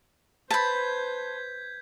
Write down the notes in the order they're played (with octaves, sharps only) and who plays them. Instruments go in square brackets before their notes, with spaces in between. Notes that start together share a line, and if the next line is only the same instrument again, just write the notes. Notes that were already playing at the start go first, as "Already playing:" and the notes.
[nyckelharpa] B4 C5 [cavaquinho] A5 B5 [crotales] G6 G#6 B6